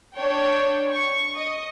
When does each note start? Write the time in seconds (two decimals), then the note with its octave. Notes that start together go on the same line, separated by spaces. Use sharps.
0.16 D4 C#5 G5
0.90 C#6
1.37 D#5